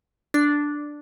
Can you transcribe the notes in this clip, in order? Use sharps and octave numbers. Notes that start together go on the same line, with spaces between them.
D4